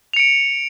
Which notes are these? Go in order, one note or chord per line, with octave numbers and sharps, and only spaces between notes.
C#7 D7 F7